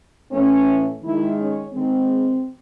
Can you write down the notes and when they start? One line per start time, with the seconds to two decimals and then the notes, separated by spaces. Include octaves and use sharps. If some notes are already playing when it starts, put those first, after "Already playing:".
0.32 A2 E3 A3 C#4
1.03 D#3 G#3 E4
1.38 C#4
1.73 D#3 G#3 C4